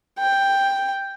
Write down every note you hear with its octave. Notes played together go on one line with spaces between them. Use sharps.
G5